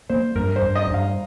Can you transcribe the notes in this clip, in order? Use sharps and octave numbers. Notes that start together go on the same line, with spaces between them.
A#3 C5
G2 A#4
C5
G2
D#5
G2
F5